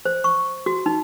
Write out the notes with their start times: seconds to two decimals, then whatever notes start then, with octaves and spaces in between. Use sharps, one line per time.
0.05 C5
0.24 C#6
0.66 F#4
0.86 D#4